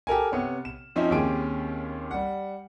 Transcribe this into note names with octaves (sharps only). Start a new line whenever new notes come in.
G4 A4 A#4 G#5
C3 B3 C#5
E7
F3 C4 C#4 D#4 E4
D#2 C4 C#4 G4 G#4 D7
G3 F#5